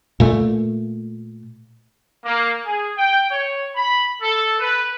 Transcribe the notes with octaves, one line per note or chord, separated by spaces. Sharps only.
A#2 A3
A#3
G#4
G5
C#5
B5
A4
B4